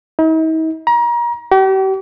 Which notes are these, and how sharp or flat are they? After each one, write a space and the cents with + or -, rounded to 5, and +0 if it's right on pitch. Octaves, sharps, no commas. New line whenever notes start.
D#4 +45
A#5 +35
G4 -40